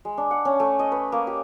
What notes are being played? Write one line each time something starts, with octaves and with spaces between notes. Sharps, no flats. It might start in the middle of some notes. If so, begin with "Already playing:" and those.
G#3
D4
F#5
C#4
A3
D#5
B4
A#3
G4